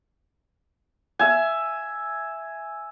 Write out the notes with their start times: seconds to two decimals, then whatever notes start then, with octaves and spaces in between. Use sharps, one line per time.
1.19 E5 G#5